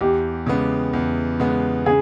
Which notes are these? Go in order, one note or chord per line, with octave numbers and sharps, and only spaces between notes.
E2 G4
C#3 G#3 B3
E2
C#3 G#3 B3
C#3 G#4